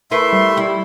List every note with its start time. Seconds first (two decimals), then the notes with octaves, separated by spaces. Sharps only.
0.11 A3 E4 A#4 B4 E5 C6
0.33 G3
0.57 E4